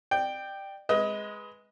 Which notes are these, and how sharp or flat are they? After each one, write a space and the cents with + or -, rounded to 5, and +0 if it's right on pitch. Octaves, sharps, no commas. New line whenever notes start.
D5 +30 G5 +0
G#3 -5 B4 -5 D#5 +20